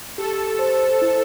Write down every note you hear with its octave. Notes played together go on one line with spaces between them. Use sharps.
G4 A4
C5
E4